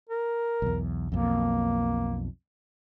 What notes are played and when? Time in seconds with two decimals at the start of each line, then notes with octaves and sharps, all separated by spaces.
0.10 A#4
0.62 B1 E2
1.12 B1 F2 A#3